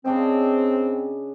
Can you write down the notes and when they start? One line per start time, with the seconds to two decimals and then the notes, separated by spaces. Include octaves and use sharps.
0.05 C#3 C4 D4 D#5